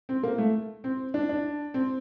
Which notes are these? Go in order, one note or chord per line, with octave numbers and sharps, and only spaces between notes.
C4
A#3
A3
C4
D4
D4
C4